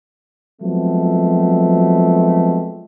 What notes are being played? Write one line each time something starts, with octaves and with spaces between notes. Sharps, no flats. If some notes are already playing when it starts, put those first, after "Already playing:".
F3 F#3 G#3 A3 B3 C4